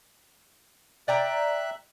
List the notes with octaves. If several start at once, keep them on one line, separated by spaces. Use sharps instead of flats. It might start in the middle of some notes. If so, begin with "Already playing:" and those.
D5 E5 G5 A#5 F#6